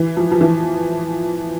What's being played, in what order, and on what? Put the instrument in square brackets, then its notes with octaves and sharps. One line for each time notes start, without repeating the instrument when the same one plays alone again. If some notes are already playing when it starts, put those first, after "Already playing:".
Already playing: [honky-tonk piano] E3
F3
F3
E3